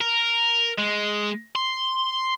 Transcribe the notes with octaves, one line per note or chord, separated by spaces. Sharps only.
A#4
G#3
C6